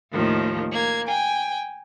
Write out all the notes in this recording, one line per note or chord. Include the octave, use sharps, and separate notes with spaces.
D#2 A2 D#3 F3
A#3 G#6
G5 G#5